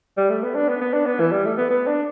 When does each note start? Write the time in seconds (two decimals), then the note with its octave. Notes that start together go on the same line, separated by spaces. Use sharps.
0.17 G3
0.30 A3
0.43 B3
0.55 D4
0.68 B3
0.81 B3
0.93 D4
1.06 B3
1.20 E3
1.32 G3
1.45 A3
1.57 B3
1.70 B3
1.87 D4